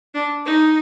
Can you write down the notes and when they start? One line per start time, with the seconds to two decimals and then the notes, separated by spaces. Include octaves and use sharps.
0.15 D4
0.46 D#4